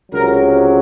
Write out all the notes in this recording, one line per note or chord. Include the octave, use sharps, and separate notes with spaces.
C#2 C3 F#3 A#4